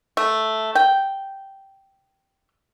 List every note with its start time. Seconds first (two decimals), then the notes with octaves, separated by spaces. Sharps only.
0.17 A3
0.75 G5